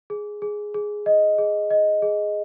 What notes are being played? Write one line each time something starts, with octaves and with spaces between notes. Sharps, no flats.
G#4
G#4
G#4
D#5
G#4
D#5
G#4